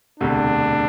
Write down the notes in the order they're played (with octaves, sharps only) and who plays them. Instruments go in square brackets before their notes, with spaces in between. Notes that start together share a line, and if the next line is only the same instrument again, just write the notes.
[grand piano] E1 D2 C3 [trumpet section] D4